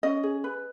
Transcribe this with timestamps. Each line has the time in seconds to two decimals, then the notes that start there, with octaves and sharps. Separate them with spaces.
0.03 C#4 D#5
0.23 G#4
0.44 B4